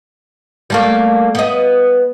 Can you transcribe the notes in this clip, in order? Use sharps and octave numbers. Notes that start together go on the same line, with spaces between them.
G3 A3 A#3
B3 D#5